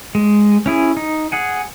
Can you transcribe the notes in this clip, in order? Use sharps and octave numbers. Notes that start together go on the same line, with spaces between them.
G#3
C#4 E4 G#4
D#4
G#4 F#5 G#5